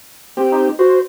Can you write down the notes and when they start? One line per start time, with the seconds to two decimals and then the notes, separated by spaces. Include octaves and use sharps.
0.37 C4 G4
0.52 D#4
0.79 F#4 C5